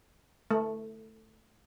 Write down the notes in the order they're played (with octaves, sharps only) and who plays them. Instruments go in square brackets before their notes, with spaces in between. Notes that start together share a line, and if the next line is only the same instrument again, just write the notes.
[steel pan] A3